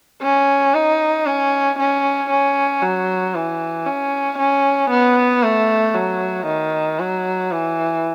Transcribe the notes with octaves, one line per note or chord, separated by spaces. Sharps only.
C#4
D#4
C#4
C#4
C#4
F#3
E3
C#4
C#4
B3
A3
F#3
D#3
F#3
E3